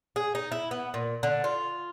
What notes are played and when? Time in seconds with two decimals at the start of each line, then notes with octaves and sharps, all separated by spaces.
0.16 G#4
0.35 D#4
0.52 E4
0.71 B3
0.94 A#2
1.23 D3
1.44 F4